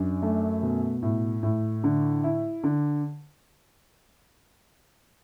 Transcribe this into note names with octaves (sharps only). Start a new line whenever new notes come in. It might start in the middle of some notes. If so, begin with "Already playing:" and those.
Already playing: F#2 D4
A3
B2
A2
A2
D3
E4
D3